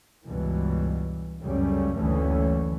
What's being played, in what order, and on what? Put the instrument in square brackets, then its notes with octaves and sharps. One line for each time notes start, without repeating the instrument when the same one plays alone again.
[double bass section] C#2 G2 B2 E3
C#2 F#2 C#3 G3 A3 C#4
F#1 D2 D3 E3 A3 C#4